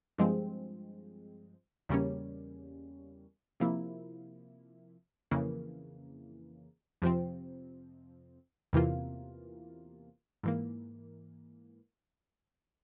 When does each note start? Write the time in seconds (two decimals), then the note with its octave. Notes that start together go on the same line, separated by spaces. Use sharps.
0.18 G2 F3 G#3 C4
1.89 E2 C#3 G3 A#3 C#4
3.60 C3 F3 A#3 E4
5.31 F2 C#3 E3 A#3
7.02 F2 C3 F3 C4
8.73 E2 C3 E3 A#3 F4
10.43 G#2 E3 A#3